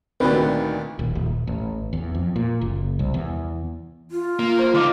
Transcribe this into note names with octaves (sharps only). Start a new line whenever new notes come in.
D2 A#2 D3 D#3 C4 F#4 B4
D#1
D#1
A1
E2
F2
A#2
F#1
C2
E2
F4
A#3
C5
D3 D#4 F5 D6